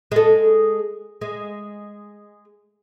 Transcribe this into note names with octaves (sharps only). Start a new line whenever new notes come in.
G#3 A4
G#3